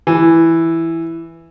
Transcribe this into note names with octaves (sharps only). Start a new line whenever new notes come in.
E3